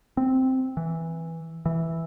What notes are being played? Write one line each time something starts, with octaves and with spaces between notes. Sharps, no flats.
C4
E3
E3